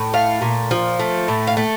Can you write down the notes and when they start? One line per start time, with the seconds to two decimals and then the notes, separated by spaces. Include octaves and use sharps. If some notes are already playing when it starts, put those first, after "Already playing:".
Already playing: A2
0.13 A3 F5
0.42 A#2
0.71 F3
1.00 A3
1.28 A2
1.47 F5
1.57 A3